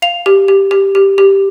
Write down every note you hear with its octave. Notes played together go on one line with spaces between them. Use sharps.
F5 F7
G4
G4
G4
G4
G4